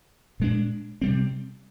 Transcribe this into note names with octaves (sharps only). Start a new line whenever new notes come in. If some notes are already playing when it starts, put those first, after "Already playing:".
A#2 G#3 D4
C3 G3 C4